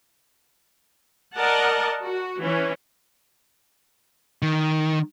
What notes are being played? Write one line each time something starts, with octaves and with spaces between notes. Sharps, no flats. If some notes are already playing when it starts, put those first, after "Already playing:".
A#4 D5 D#5 F#5 A5
F#4
E3 C#4
D#3